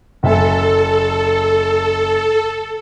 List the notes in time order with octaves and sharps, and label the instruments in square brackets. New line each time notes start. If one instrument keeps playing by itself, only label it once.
[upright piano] F#1 E5 G#5 [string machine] A4